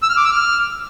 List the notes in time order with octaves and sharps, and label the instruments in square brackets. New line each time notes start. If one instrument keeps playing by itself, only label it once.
[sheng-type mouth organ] E6
F6
D6
E6
F6